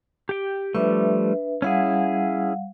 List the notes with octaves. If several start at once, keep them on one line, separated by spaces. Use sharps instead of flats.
G4 G5
F3 G3 A3 D4 B4 E5
G3 C#4 E4 G#4 F5 F#5